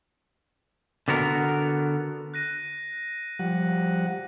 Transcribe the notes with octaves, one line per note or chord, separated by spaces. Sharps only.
D3 B3 F#4 A#4
F#6 A#6 D#7
F3 G3 F#5